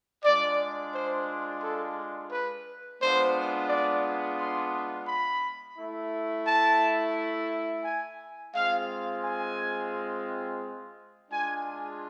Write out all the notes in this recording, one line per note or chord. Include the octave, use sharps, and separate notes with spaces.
G#3 D4 F4 D5
C5
A4
B4
G#3 B3 D4 F4 C5
D5
C6
B5
A3 E4
A5
G#5
G#3 C4 F4 F5
G#5
G#3 D4 F4 G#5